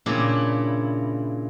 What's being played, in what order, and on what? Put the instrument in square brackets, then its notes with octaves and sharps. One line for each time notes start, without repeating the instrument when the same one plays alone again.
[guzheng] A#2 C#3 D4 E4